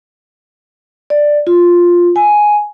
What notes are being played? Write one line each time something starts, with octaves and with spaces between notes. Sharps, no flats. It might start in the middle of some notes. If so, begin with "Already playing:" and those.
D5
F4
G#5